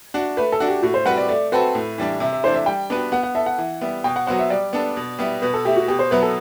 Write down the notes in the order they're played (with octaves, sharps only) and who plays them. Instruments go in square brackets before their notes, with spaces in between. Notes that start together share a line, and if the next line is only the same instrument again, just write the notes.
[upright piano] D4 F#4
[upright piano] A3 [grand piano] B4
[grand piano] A4
[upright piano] D4 F#4
[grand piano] G4
[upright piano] A2 [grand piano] F#4
[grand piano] C5
[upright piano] G3 C4 F#4 B4 [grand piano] F#5
[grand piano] D5
[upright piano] A3 [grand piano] D5
[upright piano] C4 F#4 A4 C5 [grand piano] B4
[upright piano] A2
E3 G3 D4
[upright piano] C3 [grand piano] E5
[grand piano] E5
[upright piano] E3 A3 D4 [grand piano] C5
[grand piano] E5
[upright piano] G3 [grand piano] G5
[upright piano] B3 D4 F#4 B4
[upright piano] B3 [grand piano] F#5
[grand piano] F#5
[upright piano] E4 A4 [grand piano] E5
[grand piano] F#5
[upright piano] E3
G3 B3 E4
[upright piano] B2 [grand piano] G5
[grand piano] F#5
[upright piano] F#3 B3 F#4 C5 [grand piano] F#5
[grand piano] E5
[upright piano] G3 [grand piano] D5
[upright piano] B3 D4 A4
B2
G3 B3 E4
[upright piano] B2 [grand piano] B4
[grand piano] A4
[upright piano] A3 E4 [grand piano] G4
[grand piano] F#4
[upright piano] B2 [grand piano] G4
[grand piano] C5
[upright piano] F#3 B3 E4 [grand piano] B4
[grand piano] A4